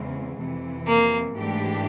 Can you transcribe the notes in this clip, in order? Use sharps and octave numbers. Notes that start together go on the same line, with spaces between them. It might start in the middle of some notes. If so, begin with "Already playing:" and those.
Already playing: E2 C#3 E3 G#3 C4
F2 C3 E3
A#3
G#2 E3 A3 D4 G4